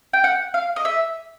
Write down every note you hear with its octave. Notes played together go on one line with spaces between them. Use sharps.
G5
F#5
F5
D#5
E5